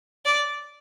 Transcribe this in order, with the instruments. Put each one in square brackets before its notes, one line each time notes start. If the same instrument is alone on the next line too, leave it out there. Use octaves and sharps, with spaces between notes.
[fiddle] D5